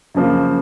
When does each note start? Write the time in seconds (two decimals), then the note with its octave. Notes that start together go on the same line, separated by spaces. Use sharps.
0.15 F#2 C#3 F3 A#3